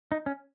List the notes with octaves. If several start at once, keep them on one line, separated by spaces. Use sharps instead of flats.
D#4
C#4